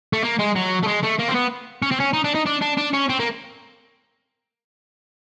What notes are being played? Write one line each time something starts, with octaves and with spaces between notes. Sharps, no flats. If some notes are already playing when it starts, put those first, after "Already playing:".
A3
A#3
G#3
F#3
A3
G#3
A3
A#3
C4
B3
C#4
C4
C#4
D#4
D4
D#4
D4
D4
D4
C#4
C4
A#3